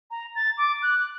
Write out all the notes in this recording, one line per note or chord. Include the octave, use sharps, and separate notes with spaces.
A#5
A6
D6
F#6